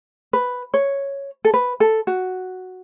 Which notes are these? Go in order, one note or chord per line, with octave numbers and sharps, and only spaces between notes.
B4
C#5
A4
B4
A4
F#4